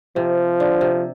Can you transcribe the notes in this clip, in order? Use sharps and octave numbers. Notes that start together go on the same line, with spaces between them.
C3 F3
D3
C3